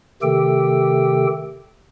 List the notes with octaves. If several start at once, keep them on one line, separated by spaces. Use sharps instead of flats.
C3 D#3 A3 G4 A4 G5